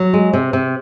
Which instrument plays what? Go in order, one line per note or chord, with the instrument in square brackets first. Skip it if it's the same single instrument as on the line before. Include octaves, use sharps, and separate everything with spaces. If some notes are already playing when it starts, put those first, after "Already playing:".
Already playing: [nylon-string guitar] F#3
G#3
C3
C3